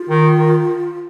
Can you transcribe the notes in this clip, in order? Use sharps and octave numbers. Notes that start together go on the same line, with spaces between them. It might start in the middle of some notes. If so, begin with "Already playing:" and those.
Already playing: F4
D#3
D#3